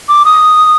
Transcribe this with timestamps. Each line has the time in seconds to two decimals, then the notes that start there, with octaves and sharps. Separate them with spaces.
0.09 D6
0.25 D#6